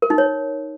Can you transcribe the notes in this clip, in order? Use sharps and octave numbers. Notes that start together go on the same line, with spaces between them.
A#4
D#4
C#5